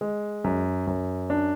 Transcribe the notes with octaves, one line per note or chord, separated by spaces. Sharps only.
G#3
F#2
F#2
D4